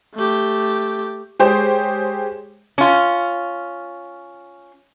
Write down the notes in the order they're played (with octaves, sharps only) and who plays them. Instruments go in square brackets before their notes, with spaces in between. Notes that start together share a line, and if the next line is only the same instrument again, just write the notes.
[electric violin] A3 G4
[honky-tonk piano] G#3 G4 G#4 C5 C#5
[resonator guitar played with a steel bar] C#4 F4